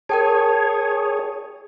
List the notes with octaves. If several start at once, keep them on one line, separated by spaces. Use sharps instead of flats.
G#4 A#4 C#5 G5 A5